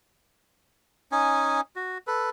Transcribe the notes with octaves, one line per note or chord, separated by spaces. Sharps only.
C#4 D#4 G#5
F#4
A4 B4